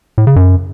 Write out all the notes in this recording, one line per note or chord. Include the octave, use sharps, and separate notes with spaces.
A2
C#3
F#2